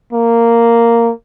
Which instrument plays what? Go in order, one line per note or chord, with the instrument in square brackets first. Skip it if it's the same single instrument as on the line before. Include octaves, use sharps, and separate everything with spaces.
[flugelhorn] A#3